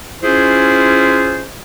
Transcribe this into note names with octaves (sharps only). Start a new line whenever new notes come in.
C#4 E4 F4 G#4 C5